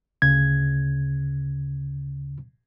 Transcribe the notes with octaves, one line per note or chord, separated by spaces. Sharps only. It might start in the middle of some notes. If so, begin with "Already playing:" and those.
D2 C#3 G#6